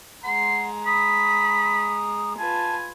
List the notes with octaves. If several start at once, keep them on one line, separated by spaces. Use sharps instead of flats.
G#3 F#5 A#5 C6
B5 D#6
F4 B4 G#5 A5